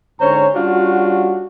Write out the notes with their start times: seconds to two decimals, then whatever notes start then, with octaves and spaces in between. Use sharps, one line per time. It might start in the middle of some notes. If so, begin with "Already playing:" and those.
0.20 G#2 D3 C#4 C5 C#5 A#5
0.55 G3 C#4 D4 F4 F#4